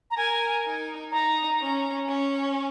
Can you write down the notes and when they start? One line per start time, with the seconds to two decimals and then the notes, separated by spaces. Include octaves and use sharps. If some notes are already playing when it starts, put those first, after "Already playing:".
0.11 A#5
0.17 A#4 G#5
0.64 D#4
1.11 D#4 A#5
1.60 C#4
2.07 C#4